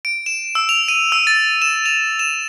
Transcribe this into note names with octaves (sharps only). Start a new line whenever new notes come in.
D7
E7
E6
F7
D#7
E6
A6
E7
F7
E7